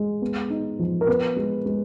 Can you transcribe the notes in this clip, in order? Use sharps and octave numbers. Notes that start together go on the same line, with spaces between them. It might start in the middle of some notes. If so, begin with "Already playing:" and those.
Already playing: G#3
B3
D#4
F3
A#4
B3 B4
G#3
G#3